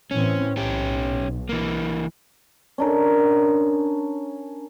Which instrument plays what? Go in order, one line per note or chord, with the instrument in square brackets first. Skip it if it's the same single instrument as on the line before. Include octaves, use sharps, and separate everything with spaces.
[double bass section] A2 E3 C4 [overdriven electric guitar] C#4
[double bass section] B1 [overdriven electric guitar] C#4 G4
[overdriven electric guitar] E3 A#3
[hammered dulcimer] C#4 D4 A#4